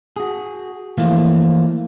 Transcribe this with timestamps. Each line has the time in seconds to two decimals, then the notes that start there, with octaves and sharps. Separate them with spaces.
0.16 F#4 G#4
0.98 E3 F3 A3 A#3 F4